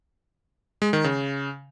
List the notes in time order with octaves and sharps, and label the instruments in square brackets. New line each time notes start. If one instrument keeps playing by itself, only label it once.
[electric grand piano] G#3
D#3
C#3